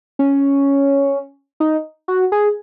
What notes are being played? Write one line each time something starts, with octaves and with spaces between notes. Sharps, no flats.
C#4
D#4
F#4
G#4